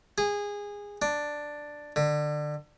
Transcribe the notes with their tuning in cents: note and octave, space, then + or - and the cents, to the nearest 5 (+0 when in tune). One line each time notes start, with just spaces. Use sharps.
G#4 -20
D4 +5
D3 +25